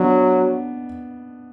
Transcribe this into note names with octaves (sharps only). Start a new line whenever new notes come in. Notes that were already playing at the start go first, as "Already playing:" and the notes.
Already playing: F#3 B3 D4